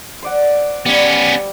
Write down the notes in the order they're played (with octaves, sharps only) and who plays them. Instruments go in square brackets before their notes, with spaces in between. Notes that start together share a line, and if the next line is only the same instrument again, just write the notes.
[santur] C5 D5 F#5
[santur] G3 [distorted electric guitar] B3 C#4